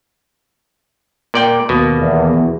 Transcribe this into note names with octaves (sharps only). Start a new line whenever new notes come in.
A#2 D5 G5
D#2 B2 A#3
E2